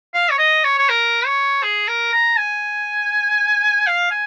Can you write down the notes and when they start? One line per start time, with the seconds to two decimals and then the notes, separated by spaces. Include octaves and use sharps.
0.14 F5
0.30 C#5
0.38 D#5
0.64 C#5
0.79 C#5
0.89 A#4
1.26 C#5
1.63 G#4
1.88 A#4
2.13 A#5
2.37 G#5
3.87 F5
4.11 G#5